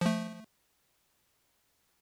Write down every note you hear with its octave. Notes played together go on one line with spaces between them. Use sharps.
F3 A3